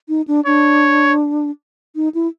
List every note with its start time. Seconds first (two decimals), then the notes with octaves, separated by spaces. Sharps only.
0.09 D#4
0.28 D4
0.46 D4 C#5
1.96 D#4
2.15 E4